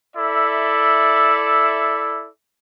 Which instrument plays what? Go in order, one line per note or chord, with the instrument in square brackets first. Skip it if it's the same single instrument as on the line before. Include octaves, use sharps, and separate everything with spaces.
[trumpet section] E4 A4 D5 E5